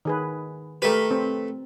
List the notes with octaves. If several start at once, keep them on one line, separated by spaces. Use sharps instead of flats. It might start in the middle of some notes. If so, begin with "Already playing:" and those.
D#3 G#4 B4
A3 G4 A#4 B4
C4